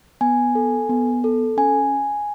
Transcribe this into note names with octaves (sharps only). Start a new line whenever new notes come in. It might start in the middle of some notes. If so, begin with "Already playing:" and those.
B3 G#5
A4
B3
A4
C#4 G#5